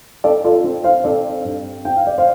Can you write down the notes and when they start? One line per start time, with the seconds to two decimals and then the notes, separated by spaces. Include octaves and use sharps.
0.24 C4 A4 D5
0.44 F4 A4
0.64 C4
0.84 C5 F5
1.04 C4 A4 D5
1.45 G2
1.85 C4 G5
1.96 F5
2.07 D5
2.18 C5 F5